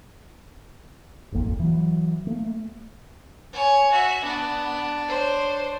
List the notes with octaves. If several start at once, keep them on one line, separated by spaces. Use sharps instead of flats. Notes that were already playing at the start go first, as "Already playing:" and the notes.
D#1 G#1 F2 A#3
E3 F#3
A3 A#3
C#5 G#5
F#4 E5
B3 D4
C5 C#5